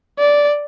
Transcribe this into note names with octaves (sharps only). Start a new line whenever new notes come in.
D5